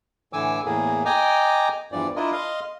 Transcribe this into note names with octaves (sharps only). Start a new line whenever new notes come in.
A2 D3 E3 G#5 D6 E6
E2 A2 A#3 G#4
D#5 G5 G#5 A#5 D6
E2 G2 E3 F3 D5
D4 E4 F4 A#4 D#5
D#5 F5 C6